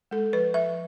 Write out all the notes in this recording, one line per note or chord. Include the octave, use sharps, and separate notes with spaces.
G#3 A4
F3 B4
F3 E5